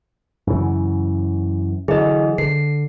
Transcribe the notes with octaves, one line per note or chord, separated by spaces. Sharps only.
F#2 C#3 E3
D3 E3 F#3 G#4 D#5
D3 C7